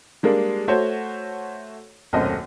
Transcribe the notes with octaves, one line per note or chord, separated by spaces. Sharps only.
G3 G#3 A#3 D4
A3 F#4 C5 C#5
D#1 B1 F#2 A3 C4 D#5